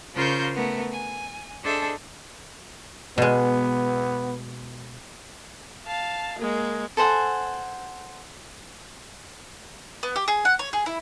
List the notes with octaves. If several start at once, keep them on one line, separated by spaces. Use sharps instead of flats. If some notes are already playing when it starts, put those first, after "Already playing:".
C#3 F4 A#4 C5 C#6 G6
A3 B3 A#4
G#5
D4 G#4 A4 C5 D#5 E5
B2 G#3 B3
F5 A5
G#3 A#3
A4 C5 F#5 G#5
B3
G4
G#4
F#5
C#5
G#4
E4